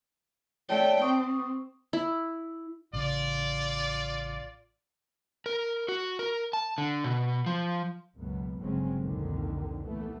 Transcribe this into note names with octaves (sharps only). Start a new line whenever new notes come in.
A3 C#5 D5 G5 A5
C4 C#6 D#6
E4
A1 C#3 F4 D5
A#4
F#4
A#4
A5
D3
B2
F3
C#2 F#2 B2 B3
G1 C#3 F#3 G#3 C4 C#4
C2 F2 A#2 D3 D#3
D#2 E3 A3 B3